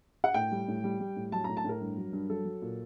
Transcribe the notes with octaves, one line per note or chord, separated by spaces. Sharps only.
F#5
A2 G5
G3
A2
G3
G3
A2
F#3 A5
A2 A#5
A5
A2 A#4
G2
F#3
G2
F#3 A4
F#3
A#2